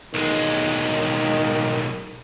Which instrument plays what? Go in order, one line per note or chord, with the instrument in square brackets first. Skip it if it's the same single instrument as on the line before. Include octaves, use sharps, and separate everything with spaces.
[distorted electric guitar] B1 G#3 [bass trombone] D#3